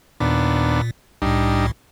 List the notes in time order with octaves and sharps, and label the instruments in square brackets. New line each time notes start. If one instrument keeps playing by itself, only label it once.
[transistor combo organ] D#2 B3 D4 [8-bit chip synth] A#2
[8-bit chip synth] C2 A2 [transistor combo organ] G3 D4 D#4